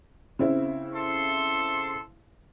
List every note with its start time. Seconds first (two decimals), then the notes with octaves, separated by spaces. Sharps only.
0.39 C#3 C4 E4
0.94 A4 C6